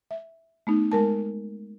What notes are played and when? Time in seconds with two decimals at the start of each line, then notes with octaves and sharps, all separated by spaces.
0.11 E5
0.67 A3 B3 D#4
0.92 G#3 A#4 A5